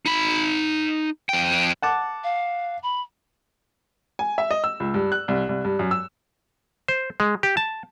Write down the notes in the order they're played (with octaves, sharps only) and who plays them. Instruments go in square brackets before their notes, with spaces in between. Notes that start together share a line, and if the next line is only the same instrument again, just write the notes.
[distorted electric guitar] D#4 B5
F2 G5
[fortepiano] F#5 A5 D6
[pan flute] F5
B5
[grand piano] G#5
E5
D#5
E6
C#2
G2
F#6
C2
C2
G2
F#2
E6
[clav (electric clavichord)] C5
G#3
G4
A5